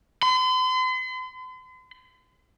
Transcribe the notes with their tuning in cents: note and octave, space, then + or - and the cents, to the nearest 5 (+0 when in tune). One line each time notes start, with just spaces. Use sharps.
C6 -45